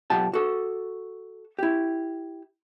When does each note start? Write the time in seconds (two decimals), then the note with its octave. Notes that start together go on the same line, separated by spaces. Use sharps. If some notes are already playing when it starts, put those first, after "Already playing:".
0.10 B1 F4 G4 F#5 A5
0.33 F#4 A4
1.59 E4 G4